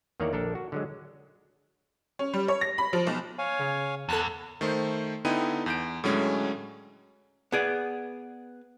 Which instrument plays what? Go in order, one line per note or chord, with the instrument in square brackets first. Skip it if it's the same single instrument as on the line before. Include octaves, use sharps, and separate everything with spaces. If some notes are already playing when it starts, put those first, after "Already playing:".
[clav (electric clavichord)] E2 D#3 A#3 C#5 D5 A#5
A#1 D4 A4 A#4
F#4
D3 F#3 G#3
[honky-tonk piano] C#4
G3
C#5
A#6
B5
F3
B1
[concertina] C#5 F5 G#5
[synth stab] C#3
[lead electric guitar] E2 [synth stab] A4 A5 F#6
[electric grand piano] D#3 A3 C5
D3 B3 D#4 E4 G5 D#7
E2 G6 D7
A2 D3 F#3 G#3 C#4
[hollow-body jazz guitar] B3 G#4 D5